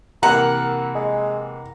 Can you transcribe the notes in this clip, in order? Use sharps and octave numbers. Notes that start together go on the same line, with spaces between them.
C3 E3 A#3 A#4 F#5 A#5
G#3